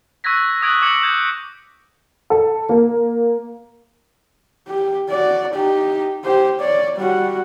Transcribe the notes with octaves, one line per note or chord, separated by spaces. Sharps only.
C#6 E6 F#6 G#6 A#6 B6
D#6 F#6 G#6 D7 F#7
D6 G#6 C#7 F#7
D#6 G6 G#6
A4
A#3
G4
F#4 D5
D#4 G4
G4 C5
C#5 D5
G3 F#4